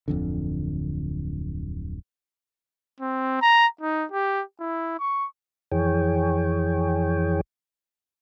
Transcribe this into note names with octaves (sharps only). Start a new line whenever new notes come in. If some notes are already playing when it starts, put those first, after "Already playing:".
D1 F2 D3
C4
A#5
D#4
G4
E4
C#6
F2 E3 G#4 C#5 G5